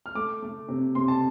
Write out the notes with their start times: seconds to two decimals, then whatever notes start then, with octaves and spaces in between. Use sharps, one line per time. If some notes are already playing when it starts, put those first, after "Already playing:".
0.06 F6
0.15 A3 D6
0.42 A3
0.69 C3
0.95 C3 C6
1.08 A5